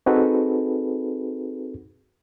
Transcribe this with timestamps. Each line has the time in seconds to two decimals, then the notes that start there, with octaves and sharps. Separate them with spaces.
0.06 C4 D#4 F#4 G#4 A4 B4